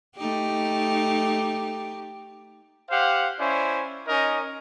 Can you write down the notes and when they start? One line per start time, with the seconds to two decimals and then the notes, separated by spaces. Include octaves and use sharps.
0.17 A3 D#4 G4
2.90 G4 C5 F5 F#5
3.39 C#4 E4 C5 D5
4.08 C#4 D#4 A#4 D#5